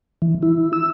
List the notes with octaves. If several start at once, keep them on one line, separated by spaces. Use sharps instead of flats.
E3
E4
E6